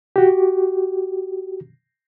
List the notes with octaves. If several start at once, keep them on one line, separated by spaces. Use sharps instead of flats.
F#4 G4